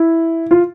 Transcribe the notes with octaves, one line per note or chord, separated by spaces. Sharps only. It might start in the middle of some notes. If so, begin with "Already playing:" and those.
Already playing: E4
F4